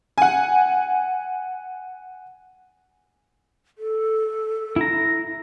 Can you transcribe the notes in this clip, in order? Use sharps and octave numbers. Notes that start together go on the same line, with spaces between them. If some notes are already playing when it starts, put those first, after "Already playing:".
F#5 G#5
A4
E4 A#5